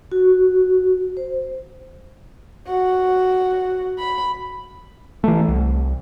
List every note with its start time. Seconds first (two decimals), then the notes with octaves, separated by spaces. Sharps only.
0.12 F#4
1.17 C5
2.67 F#4
3.98 B5
5.24 E3 A3
5.48 C2